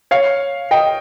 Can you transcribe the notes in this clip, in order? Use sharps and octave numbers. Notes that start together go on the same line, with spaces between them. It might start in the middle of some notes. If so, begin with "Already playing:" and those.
C#5 F5
D#5 G5